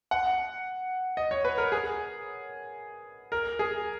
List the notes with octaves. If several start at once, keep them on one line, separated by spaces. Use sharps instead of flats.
F#5
D#5
C#5
B4
A#4
G#4
A#4
G#4